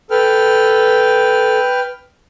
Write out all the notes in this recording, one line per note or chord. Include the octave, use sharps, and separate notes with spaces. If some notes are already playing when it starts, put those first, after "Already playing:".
A4 B4 G5 F6